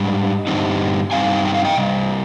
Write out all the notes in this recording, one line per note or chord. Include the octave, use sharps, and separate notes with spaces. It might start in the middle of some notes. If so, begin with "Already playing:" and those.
Already playing: G#2 G3 D4 D#5 G5
G2 D3 G3 C4 D#4
G2 D3 G3 C4 D#4 F5 G#5
G5
F5
D#5 G5
C3 G3 D#5